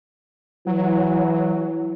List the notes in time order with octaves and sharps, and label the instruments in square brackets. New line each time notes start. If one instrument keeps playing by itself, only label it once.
[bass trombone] E3 [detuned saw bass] F#3